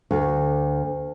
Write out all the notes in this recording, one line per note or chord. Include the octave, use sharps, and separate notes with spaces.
D2